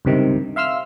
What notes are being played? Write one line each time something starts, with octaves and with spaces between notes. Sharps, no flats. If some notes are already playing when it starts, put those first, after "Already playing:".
C#2 G2 C3 D#3
E5 F5 C6 E6 F6